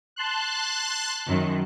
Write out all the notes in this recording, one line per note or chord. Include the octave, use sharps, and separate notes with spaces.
A5 C6 F#6
F#2 D#3